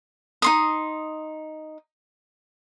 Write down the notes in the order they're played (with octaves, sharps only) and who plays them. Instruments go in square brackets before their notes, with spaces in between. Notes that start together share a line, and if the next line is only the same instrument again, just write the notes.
[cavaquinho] D#4 C6 D#6